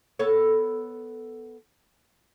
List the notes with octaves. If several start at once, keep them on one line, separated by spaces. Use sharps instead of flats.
B3 A4 C#5